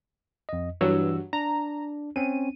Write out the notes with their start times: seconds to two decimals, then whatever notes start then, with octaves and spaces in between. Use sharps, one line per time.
0.49 F2 D#5
0.81 G2 E3 F#3 E6
1.33 D4 A#5
2.16 C4 C#4 D#7